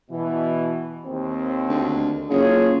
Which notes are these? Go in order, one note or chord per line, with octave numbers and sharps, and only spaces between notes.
B2 E3
D#2 C4
D2
F#1 F4 G#4 C#5